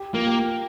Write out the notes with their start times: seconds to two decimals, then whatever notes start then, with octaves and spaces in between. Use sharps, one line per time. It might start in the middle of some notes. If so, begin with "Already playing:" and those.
Already playing: G4
0.13 A#3 F4
0.26 G4